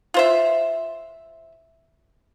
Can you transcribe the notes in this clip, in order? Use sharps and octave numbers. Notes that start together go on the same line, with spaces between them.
F4 C5 E5